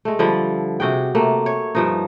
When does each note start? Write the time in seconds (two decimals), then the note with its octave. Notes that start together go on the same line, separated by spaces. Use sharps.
0.05 G#3 A3
0.19 D3 F3 G3
0.80 C3 F#4 G#4 G5
1.15 C3 A3 A#3
1.46 C#5
1.75 G2 F3 D#4